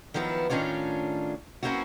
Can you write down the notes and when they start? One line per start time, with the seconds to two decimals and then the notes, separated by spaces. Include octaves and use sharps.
0.14 D#3 F3 F#3 B3 E4
0.50 A2 D#3 C#4 D4 F4 C#5
1.63 F#3 A#3 C4 C#4 E4 F#4